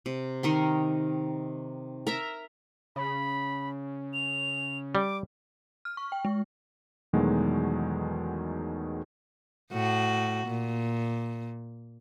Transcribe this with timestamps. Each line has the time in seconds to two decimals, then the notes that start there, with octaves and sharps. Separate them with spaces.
0.06 C3
0.43 D#3 A#4 C6
2.07 A#4 E5 A#5
2.96 C#3 B5
4.14 F7
4.95 G3 D6
5.85 F6
5.97 C#6
6.12 G5
6.25 G#3
7.13 E2 B2 D#3 F#3 G#3 A3
9.72 A2 F#4
10.47 A#2